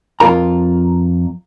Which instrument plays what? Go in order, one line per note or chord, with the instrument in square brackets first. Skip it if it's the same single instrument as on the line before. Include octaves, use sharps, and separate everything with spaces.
[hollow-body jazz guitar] F2 F4 A#4 A#5